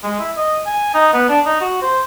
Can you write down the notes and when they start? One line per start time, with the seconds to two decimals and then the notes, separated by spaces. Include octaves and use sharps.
0.03 G#3
0.20 E4
0.37 D#5
0.66 G#5
0.94 D#4
1.13 B3
1.29 D4
1.46 D#4
1.61 F#4
1.82 C5